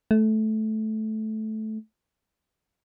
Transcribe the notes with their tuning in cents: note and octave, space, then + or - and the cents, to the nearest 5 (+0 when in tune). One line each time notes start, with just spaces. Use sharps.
A3 -15